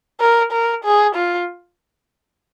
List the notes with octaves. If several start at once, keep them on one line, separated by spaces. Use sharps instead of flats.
A#4
A#4
G#4
F4